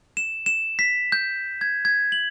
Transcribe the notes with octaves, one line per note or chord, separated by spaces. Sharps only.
E7
E7
B6
G6
G#6
G#6
F#7